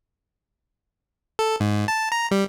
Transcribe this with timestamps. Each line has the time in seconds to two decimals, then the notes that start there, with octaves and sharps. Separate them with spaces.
1.39 A4
1.60 G#2
1.88 A5
2.12 A#5
2.31 G3